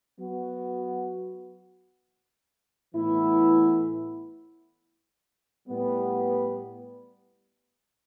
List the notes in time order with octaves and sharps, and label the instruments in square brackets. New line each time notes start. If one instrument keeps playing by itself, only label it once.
[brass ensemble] F#3 B3 F#4
A2 E3 B3 E4
A2 G3 B3